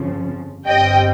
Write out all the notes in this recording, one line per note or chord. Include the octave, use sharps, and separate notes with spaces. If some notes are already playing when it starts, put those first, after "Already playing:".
Already playing: G1 F2 C#3 F3
G1 G2 G3 C4 D#5 G5